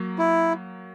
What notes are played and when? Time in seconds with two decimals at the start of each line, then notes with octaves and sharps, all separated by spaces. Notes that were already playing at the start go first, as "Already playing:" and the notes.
Already playing: F#3 A#3
0.19 E4